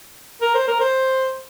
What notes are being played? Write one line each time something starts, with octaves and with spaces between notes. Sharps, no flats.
A#4
C5
A#4
C5